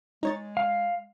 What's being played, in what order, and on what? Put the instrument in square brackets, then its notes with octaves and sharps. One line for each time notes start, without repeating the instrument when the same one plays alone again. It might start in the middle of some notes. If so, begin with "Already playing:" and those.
[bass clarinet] G#3 [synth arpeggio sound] D#4 C#5 A6
[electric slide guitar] F5